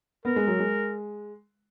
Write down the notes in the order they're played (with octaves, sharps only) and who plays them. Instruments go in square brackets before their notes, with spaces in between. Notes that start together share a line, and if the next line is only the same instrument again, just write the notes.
[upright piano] B3 [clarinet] A#4
[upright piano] G#3
F#3
G#3